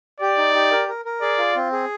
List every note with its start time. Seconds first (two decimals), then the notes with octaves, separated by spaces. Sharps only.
0.20 G4 D5
0.38 D#4
0.55 G4
0.71 A#4
0.88 A#4
1.05 A#4
1.22 G#4 D5
1.38 F4
1.56 C4
1.72 G#4